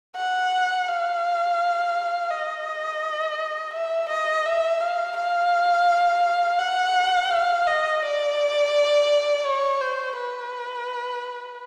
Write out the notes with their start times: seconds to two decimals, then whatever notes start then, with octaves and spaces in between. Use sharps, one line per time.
0.16 F#5
0.88 F5
2.31 D#5
3.73 E5
4.09 D#5
4.46 E5
4.80 F5
5.16 F5
6.59 F#5
7.31 F5
7.67 D#5
8.02 D5
9.45 C#5
9.81 C5
10.16 B4